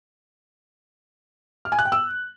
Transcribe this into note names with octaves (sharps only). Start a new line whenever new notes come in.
F6
G#5
F#6
G5
E6